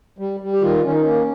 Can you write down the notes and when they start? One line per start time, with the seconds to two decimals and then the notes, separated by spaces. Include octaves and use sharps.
0.18 G3
0.40 G3
0.53 G4
0.62 D#3 F4
0.84 D#3 C#4
0.93 D#4
1.01 A#3 C#4